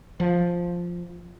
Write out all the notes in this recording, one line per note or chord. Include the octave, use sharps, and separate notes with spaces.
F3